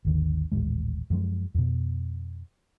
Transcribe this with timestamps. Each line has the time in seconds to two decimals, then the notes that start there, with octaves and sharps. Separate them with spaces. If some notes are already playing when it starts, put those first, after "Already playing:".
0.05 G#1 D#2 D3
0.52 D#1 A1 A2 G#3
1.10 F#2 F3 G#3
1.55 F2 B2